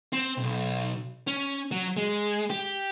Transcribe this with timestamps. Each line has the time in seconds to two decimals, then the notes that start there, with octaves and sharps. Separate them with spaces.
0.13 C4
0.37 B1
1.27 C#4
1.71 F#3
1.97 G#3
2.50 G4